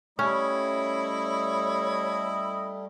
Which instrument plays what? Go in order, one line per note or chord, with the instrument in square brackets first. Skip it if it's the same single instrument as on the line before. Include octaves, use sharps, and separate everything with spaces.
[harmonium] G3 A3 [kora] C#4 [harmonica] E4 D#5 [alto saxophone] C#5